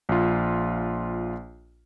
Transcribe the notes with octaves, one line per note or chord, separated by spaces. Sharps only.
A#1 F4